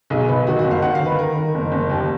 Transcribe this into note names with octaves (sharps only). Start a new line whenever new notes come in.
B1 G#4
B1 B4
D#3 F#4
F#4
F#1
F5
D#3 F#5
F5
D#3
B4
D#3 A#4
D#3
F#1
F#1
D#2